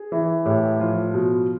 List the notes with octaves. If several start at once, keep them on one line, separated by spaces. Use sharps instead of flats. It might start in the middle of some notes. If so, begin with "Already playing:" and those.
Already playing: G#4
E3
A2 G4
F3 F4
B2